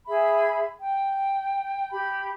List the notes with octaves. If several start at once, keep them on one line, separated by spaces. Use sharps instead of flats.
G#4 E5 B5
G5
G4 B5